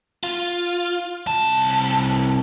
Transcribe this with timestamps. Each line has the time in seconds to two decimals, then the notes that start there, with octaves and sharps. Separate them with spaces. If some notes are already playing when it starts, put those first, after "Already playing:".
0.23 F4
1.27 C2 A5